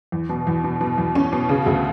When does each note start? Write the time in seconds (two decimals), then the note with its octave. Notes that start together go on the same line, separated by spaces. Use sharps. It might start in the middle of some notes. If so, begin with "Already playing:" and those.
0.12 E2
0.29 B2
0.47 E2
0.64 B2
0.81 B2
0.98 E2
1.15 C#4
1.32 B2
1.49 C#3
1.66 D2